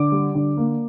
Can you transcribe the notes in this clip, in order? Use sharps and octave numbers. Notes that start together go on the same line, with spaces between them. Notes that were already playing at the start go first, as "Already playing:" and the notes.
Already playing: D3 D6
G3
D3
A#3